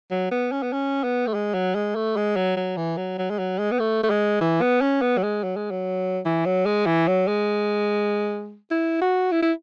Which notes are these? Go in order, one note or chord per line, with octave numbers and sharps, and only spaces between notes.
F#3
B3
C#4
B3
C#4
B3
A3
G#3
F#3
G#3
A3
G#3
F#3
F#3
E3
F#3
F#3
G#3
F#3
G#3
B3
A3
A3
G#3
E3
B3
C#4
B3
F#3
G#3
F#3
G#3
F#3
E3
F#3
G#3
E3
F#3
G#3
E4
F#4
E4
E4